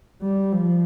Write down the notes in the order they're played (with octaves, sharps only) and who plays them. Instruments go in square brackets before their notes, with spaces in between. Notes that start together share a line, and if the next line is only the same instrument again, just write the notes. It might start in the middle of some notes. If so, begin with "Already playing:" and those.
[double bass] G3
F3